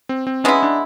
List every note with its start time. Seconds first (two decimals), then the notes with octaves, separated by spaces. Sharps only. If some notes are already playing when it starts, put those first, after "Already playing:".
0.09 C4
0.27 C4
0.44 G#3 B3 C#4 E4
0.63 D4